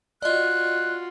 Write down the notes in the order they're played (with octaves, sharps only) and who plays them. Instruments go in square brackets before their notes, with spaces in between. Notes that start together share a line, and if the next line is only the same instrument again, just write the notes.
[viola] F4 F#4 [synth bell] D5 D#5 [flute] F#6